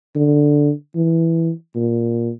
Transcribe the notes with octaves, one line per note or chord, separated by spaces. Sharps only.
D3
E3
A#2